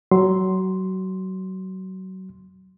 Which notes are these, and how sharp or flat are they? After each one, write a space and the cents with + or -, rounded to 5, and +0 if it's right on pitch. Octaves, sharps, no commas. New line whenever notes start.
F#3 +25 C6 +0